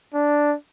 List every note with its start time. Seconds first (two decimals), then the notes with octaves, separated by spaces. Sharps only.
0.14 D4